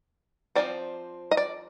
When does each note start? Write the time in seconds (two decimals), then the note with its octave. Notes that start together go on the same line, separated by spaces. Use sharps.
0.55 F3 A3 C4 D5
1.31 D#5
1.37 D5